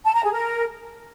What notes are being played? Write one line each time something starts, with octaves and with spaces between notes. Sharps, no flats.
A5
A#5
G#4
A#4